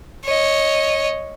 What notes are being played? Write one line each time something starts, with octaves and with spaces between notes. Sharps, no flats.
C#5 D#5